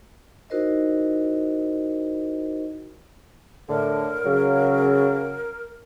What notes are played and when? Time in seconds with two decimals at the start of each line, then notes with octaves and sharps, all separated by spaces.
0.50 D#4 E4 F#4 A#4 C5 D#5
3.69 A2 D3 A#4
4.25 C#3 F#3